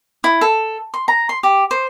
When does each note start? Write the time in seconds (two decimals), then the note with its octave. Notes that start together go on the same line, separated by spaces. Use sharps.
0.24 E4
0.41 A4
0.94 C6
1.08 A#5
1.29 C6
1.43 G4
1.71 C5